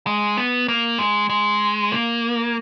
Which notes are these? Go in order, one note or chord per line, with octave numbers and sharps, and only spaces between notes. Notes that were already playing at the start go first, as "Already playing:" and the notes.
G#3
B3
A#3
G#3
G#3
A#3